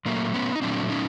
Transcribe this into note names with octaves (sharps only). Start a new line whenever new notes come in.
A#2 F#3 A3 A#3
B3 C#4
D#4
A#2 F#3 A3 C4 D4
C#4 D#4